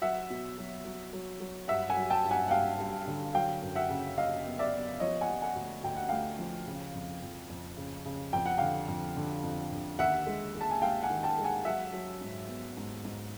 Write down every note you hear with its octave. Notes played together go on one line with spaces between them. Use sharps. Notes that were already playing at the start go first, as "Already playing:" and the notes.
F#3 E5 F#5
B2
F#3
F#3
F#3
F#3
G2 E5 F#5
F#5 G#5
F#3
G5 A5
G2
F#5 G#5
F#5
G2 F5 G5
G2
D3
F#3 F5 G5
F#2
E5 F#5
C#3
F#3 D#5 F5
B3
D5 E5
B3
F3 C#5 D#5
F#5 G#5
F3
F#5 G#5
D2
D2 G5
F#5
A3 F5 G5
F3
C#3
F2
F2
F2
C#3
C#3
F2 G5
F#5
D3 F5 G5
F2
D3
F2
D3
D#2 E5 F#5
G#3
G#3
A5
G#5
G#3 F5 G5
F#5 G#5
D#3
G5 A5
G#3
F#5 G#5
F#3 E5 F#5
F#3
G#2
B3
G#2
G#2